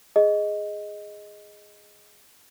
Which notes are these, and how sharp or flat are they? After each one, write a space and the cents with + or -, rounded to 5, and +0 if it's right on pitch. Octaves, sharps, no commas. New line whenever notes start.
G#4 +0 D#5 +0